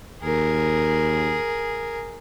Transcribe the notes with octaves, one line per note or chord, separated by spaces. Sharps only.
D#2 G#4 A#4